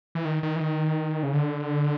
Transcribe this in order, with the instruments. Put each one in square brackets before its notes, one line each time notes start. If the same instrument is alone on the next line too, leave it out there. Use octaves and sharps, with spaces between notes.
[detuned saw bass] E3
D#3
D#3
E3
D#3
C#3
D3